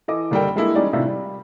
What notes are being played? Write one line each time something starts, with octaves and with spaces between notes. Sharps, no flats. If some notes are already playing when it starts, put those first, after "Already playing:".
E3 A4 D#5 D6
F#1 D3 G3 A4 A#4 G5
G3 G#3 A#3 D4 E4 A4
E3 G3 G#3 C#4 D#4 D5
A2 C3 D#3 D4 F4 E5
G3